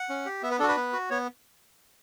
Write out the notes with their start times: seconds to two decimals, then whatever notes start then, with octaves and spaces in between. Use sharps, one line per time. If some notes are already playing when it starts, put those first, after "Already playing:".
Already playing: F#5
0.09 C#4
0.26 G4
0.43 B3 E5
0.51 B4
0.59 D4 A4
0.63 F#4
0.68 B4
0.77 B3
0.93 F#4
1.10 B3 C#5